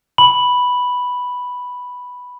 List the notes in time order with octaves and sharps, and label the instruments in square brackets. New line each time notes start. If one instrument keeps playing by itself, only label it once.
[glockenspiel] B5 F#7